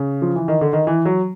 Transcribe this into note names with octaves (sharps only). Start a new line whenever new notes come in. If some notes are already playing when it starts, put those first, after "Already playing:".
Already playing: C#3
F3
E3
D#3
D3
D#3
E3
F#3